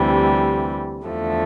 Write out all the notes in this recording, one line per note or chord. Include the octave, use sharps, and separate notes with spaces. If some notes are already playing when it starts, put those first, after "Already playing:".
Already playing: D2 C3 E3 G3
E2 D3 F3 A3